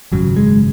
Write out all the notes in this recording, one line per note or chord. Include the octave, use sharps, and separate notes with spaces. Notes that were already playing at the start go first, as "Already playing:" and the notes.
G#1 F#2 C#3 F#3
G#3